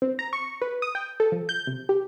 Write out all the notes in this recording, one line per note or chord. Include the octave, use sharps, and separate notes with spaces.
C4
A#5
C#6
B4
D#6
G5
A4
F3
G6
C3
G4